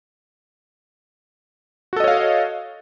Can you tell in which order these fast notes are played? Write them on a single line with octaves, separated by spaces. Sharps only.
F#4 A4 D#5 C#5 F5